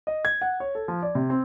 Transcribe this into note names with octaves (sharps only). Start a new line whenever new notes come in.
D#5
G#6
F#5
C#5
A4
F3
D5
C3
C4